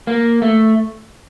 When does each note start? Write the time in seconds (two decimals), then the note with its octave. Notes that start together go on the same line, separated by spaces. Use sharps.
0.07 A#3
0.42 A3